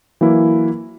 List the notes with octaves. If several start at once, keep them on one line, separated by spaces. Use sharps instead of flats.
E3 F#3 A#3 E4